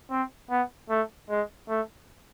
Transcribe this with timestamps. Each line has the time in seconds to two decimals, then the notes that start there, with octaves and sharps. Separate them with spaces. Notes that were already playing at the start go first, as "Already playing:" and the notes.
0.10 C4
0.50 B3
0.90 A3
1.29 G#3
1.69 A3